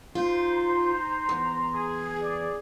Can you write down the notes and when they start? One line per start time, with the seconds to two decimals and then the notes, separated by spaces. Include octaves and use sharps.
0.15 D#4 F4 C5
0.53 A#5 C6
1.29 E2
1.74 G#4
2.20 D5